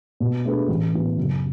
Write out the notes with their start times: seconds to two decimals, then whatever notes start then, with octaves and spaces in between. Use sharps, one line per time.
0.20 B2
0.45 A3 D4 G#4 B4
0.69 A1
0.93 A2 E3 B3
1.18 F#1